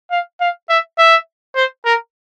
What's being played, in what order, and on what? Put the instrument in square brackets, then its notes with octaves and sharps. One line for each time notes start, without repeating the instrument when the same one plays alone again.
[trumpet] F5
F5
E5
E5
C5
A#4